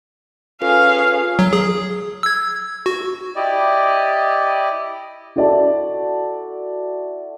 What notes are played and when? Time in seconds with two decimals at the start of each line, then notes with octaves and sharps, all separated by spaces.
0.62 C#4 F4 G#4 A4 B4 F5
1.39 F#3
1.53 G#4
2.23 E6 G#6
2.86 F#4
3.36 E4 G4 D5 D#5
5.36 E4 F#4 A4 D5 E5 A5